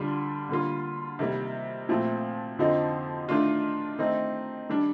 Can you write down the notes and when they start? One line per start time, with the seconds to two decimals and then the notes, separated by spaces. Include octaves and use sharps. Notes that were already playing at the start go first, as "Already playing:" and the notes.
Already playing: D3 G3 D4 F4
0.49 D3 G3 A#3 F4
1.19 C3 D#3 G3 A#3
1.89 A#2 F3 A3 C4
2.59 F2 D3 F3 C4 D#4
3.29 D#3 A3 D4 F4
3.99 D#3 A3 C4 D#4
4.69 D#3 G3 D4